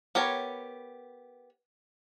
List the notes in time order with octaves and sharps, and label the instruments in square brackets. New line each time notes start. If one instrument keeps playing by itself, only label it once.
[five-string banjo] B3 G4 A#4 C#5